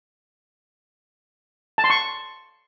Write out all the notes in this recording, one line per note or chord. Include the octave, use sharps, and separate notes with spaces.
A5
C6
C#6